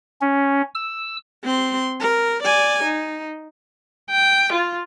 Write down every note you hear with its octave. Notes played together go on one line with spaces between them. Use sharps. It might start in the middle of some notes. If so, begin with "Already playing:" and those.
C#4
E6
C4 C6
A#4
D5 G#5
D#4
G5
F4